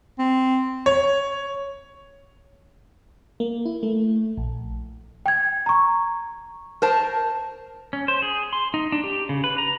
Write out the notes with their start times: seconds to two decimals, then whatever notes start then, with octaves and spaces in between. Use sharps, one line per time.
0.19 C4
0.86 C#5
3.40 A#3
3.65 E4
3.83 A3
4.37 A#1
5.26 G5 G#6
5.66 A#5 C#6
6.82 A#4 C5 A5
7.93 C#4
8.08 C5
8.22 G#4
8.53 C6
8.74 D#4
8.92 D4
9.04 G4
9.29 C#3
9.44 B4
9.58 A#5